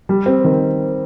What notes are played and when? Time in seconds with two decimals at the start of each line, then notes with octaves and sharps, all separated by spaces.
0.09 G3
0.26 C4
0.44 D#3